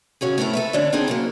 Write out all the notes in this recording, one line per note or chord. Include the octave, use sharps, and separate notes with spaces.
C#3 C#4 F#4 G#4
A3 B3 C4 E4 A#4
A4 B4 E5
D3 C#4 D4
B3 C4 D4 D#4 G#4
C#3 F#3 A#3